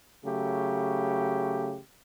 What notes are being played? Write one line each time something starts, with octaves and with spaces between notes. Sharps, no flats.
C#3 F#3 A3 G4